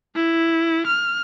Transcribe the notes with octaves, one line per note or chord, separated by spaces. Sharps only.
E4
F6